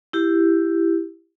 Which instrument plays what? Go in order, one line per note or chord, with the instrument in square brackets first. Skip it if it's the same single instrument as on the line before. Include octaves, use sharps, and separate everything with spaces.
[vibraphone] E4 G4